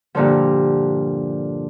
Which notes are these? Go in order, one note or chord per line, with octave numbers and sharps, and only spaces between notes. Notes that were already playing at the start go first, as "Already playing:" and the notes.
G2 A#2 D3 F3